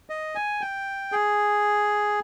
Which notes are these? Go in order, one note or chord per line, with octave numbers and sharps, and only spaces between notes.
D#5
G#5
G5
G#4